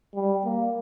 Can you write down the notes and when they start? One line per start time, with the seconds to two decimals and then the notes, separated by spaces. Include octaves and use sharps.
0.15 G3
0.45 A#3